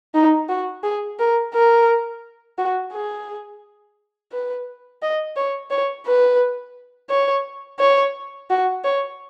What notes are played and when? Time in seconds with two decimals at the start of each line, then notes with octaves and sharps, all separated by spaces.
0.15 D#4
0.49 F#4
0.83 G#4
1.19 A#4
1.54 A#4
2.58 F#4
2.93 G#4
4.32 B4
5.02 D#5
5.36 C#5
5.71 C#5
6.07 B4
7.10 C#5
7.79 C#5
8.50 F#4
8.84 C#5